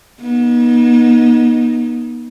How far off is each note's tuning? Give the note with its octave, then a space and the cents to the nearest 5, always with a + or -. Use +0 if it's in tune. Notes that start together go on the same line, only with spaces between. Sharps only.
B3 -40 D#4 -5